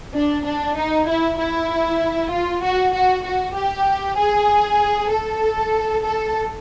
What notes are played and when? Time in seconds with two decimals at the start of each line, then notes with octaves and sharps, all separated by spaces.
0.15 D4
0.46 D4
0.77 D#4
1.07 E4
1.38 E4
2.31 F4
2.63 F#4
2.93 F#4
3.25 F#4
3.55 G4
4.18 G#4
5.11 A4
6.04 A4